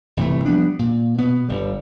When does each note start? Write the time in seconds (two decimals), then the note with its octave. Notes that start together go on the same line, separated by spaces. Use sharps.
0.17 G1 C3 E3 A3
0.45 F3 G3 B3 D4
0.79 A#2
1.18 B2 B3
1.48 G1 G3